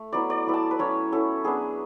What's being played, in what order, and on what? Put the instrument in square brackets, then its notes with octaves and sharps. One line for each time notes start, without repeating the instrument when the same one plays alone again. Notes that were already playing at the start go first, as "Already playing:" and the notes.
Already playing: [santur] A3
F#3 B3 E4 D5
D5
F#3 B3 E4
A5
B4
F#3 C#4 E4 C#5
F#3 C#4 E4 A4
F#3 B3 D4 G#4